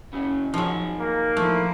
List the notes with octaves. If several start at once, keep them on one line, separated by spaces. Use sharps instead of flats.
C#3 F#3 C#4
D#3 F3 F#3 D#4 G#4
A#3
F3 A3 E4